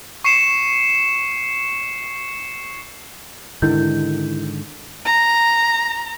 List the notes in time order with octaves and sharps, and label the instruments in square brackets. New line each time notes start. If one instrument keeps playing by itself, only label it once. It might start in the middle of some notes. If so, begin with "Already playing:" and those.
[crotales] C#6 C7 C#7 E7
[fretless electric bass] G#2 D3 D#3 [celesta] E4 G6
[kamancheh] A#5